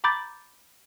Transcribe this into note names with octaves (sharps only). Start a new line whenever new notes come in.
A#5 B5 D6 G6 A6